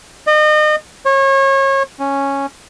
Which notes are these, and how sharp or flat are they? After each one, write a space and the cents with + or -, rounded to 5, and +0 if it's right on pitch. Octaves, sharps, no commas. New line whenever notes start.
D#5 -35
C#5 -30
C#4 -5